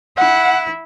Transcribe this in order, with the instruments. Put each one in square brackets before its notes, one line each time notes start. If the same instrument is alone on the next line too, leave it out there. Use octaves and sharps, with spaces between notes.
[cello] E4 [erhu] F#5